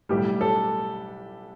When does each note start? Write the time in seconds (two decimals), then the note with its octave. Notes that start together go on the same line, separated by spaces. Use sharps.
0.09 B1 A2 G3 G4
0.41 A4